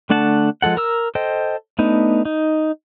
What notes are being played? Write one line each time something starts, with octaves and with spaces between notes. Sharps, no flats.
D3 A3 D4 F#5 A5
F3 G#3 A4 F#5
A#4 A#5 E6
A4 C5 D#5 G5
A3 B3 D4 D#4
D#4